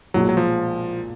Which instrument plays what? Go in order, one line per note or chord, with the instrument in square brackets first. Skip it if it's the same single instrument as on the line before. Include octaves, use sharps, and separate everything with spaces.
[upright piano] B1 A#2 G#3 [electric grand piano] F#3
[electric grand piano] F#3
F3